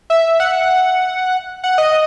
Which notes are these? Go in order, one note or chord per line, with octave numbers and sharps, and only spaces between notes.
E5
F#5
F#5
D#5